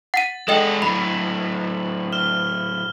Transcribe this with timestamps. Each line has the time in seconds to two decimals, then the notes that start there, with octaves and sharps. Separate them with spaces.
0.14 F#5 A6 B6 D#7
0.48 G#3 D4 F#4 A4 D#5 G5 F#7
0.82 A2 F#3 B5
2.12 F6 E7 G7